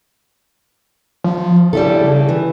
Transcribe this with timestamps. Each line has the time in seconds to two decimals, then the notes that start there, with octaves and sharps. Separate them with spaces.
1.24 F3
1.73 C#3 G3 E4 A4
2.29 E3